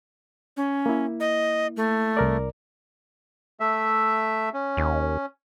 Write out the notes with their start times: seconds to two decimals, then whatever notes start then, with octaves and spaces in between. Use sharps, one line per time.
0.57 C#4
0.86 A#3 E4
1.20 D#5
1.77 A3
2.17 C2 A#4 D5
3.60 A3 E5
4.53 C#4
4.77 D#2